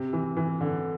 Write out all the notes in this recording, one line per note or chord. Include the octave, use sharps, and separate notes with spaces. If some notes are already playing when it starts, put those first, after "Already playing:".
Already playing: C3
E3
E3
D3